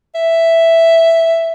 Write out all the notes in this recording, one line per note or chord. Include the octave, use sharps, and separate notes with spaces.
E5